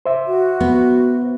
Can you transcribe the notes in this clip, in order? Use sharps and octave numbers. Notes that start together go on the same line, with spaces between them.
C5 E5
F#4
B3